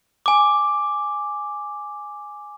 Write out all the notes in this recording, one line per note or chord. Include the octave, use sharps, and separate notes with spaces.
G#5 D6